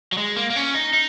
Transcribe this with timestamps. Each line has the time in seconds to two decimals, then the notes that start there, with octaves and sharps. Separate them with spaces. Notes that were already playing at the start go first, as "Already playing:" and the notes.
0.12 F#3
0.18 G#3
0.36 A#3
0.50 A#3
0.56 C#4
0.75 D#4
0.93 D#4